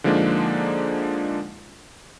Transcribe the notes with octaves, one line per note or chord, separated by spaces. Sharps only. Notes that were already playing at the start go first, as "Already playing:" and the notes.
D3 F3 G#3 A#3 D4 D#4